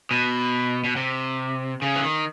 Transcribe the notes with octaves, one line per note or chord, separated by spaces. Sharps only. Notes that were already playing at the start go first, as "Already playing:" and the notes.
B2
B2
C3
C#3
E3
D#3